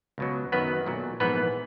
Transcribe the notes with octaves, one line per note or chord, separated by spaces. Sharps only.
C#2 B2 F#3
F#2 D#3 F#3 B3 B4
B1 A#2 F#3
A#1 G#2 E3 B3 B4